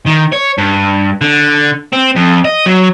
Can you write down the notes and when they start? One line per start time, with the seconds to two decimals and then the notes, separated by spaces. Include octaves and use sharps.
0.06 D#3
0.32 C#5
0.58 G2
1.21 D3
1.93 C4
2.16 F2
2.45 D#5
2.66 F#3